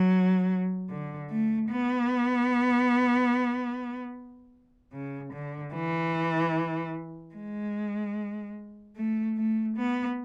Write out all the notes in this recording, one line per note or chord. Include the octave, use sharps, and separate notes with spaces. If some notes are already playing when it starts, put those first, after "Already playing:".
Already playing: F#3
D3
A3
B3
C#3
D3
E3
G#3
A3
A3
B3